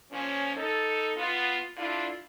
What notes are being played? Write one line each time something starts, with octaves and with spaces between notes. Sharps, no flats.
A#2 F3 C#4
D#4 A4
B3 F4
D3 D4 E4 F4